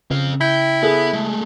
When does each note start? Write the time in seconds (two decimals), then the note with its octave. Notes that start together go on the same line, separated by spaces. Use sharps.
0.11 C#3 C4 F5
0.41 E4 G5
0.83 B3 G#4 A4
1.13 G#3 A3